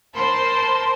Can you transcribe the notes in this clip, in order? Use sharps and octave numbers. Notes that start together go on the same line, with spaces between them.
A#4 C5 A5 B5 C6